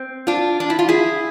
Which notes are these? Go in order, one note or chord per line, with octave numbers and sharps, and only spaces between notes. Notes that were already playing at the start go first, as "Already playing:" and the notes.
Already playing: C4
D4 F4
D4
E4
F4
E4 G#4